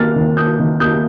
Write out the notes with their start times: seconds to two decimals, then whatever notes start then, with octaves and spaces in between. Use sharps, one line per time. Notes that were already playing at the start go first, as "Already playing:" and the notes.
Already playing: D#3 A#3 F6 A6
0.16 D#3
0.37 A#3 D#6 G6
0.60 D#3
0.80 A#3 D#6 G6